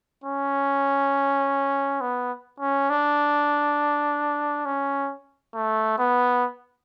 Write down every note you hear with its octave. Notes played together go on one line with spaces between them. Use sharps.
C#4
B3
C#4
D4
C#4
A3
B3